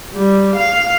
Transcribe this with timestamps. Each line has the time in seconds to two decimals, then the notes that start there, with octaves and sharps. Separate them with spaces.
0.14 G3
0.56 F5